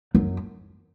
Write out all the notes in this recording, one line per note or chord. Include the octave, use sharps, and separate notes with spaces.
F#2